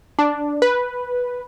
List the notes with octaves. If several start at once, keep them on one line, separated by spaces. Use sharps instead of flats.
D4
B4